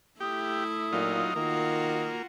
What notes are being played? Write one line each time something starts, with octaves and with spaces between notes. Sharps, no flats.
A3 E4 G4 D#6
A#2 F#3 D#4 F4
D#3 A#3 F4 F#4